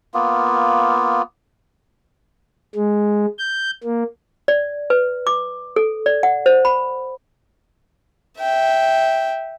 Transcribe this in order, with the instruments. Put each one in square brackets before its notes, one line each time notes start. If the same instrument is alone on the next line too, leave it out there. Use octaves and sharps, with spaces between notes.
[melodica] A#3 B3 F4
[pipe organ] G#3
G6
A#3
[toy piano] D5
B4
D6
A4
D5
F#5
C5
B5
[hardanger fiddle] E5 G5